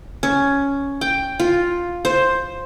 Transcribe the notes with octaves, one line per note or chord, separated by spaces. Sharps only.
C#4
G5
F4
C5